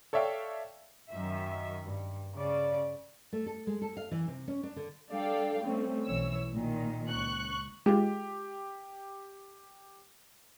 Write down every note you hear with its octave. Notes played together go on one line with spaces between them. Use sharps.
A4 C#5 D5 E5 F5 G5
F#2 D#3 E5
G2
C#3 D5
A3
A4
G#3
A4
F5
E3
C3
C#4
D4
D3
G3 D4 A4 D5 F5 G5
G3 A3 C4 C#4
B1 E3 C#5 E6
A#2 D#3
C#2 C#6 F#6
G#3 F4 G4